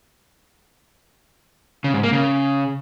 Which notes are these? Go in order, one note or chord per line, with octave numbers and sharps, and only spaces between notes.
C#3
G#2
A#3
C#3